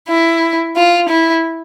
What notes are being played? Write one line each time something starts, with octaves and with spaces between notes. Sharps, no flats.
E4
F4
E4